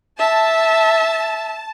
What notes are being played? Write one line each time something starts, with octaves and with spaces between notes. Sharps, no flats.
E5 A5